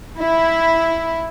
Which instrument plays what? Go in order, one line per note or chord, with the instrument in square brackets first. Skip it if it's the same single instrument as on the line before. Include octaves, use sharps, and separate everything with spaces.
[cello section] E4